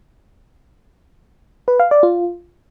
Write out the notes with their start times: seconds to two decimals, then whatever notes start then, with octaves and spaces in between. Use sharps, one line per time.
1.68 B4
1.80 F5
1.91 D5
2.03 F4